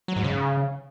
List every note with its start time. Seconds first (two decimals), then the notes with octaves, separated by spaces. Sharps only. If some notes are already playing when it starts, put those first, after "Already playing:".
0.08 F#3
0.16 G#2
0.24 C#3